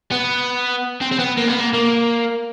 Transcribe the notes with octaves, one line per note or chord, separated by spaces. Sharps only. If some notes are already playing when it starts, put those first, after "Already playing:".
B3
C4
C4
B3
A#3
B3
A#3
A#3